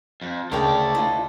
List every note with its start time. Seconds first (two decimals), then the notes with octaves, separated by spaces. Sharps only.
0.21 F2
0.52 D2 C#3 A3 A#4 D5 F5 G5 A5
0.95 E4 F4 D#5